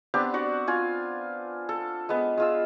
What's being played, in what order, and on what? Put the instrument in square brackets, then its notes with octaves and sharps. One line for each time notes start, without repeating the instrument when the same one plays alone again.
[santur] B3 C4 D4 G4
D4 F#4 F#5
F4 G#5
A4
G#3 B3
G#3 F4 E6